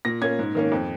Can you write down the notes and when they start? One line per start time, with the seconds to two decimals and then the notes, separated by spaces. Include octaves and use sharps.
0.05 A#2 A#6
0.21 A#3 C#4 G#6
0.39 G#2
0.55 D#3 A#3 C#4
0.72 F2